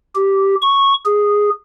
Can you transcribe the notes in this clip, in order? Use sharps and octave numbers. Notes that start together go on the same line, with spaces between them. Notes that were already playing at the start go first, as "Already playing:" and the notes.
G4
C#6
G#4